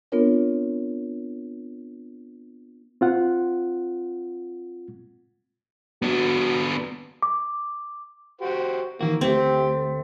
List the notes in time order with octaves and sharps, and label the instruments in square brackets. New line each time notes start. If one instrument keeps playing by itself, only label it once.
[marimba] B3 C4 D4 F4 A#4 C#5
[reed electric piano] C4 F4 F#5
[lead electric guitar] B3 D4 [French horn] F#4
[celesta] D6
[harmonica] F#4 G4 C5
[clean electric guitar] D#3 E3 F#4 [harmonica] A#3
[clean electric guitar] D2 A3 [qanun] C4 [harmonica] G4